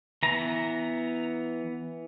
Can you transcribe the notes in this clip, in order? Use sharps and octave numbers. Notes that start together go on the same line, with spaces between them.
E3 B3 A#5